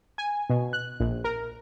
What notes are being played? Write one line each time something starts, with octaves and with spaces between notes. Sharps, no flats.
G#5
B2
F#6
A#1
A#4